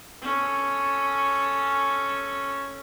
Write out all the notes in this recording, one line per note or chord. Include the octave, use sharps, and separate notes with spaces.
C#4 A4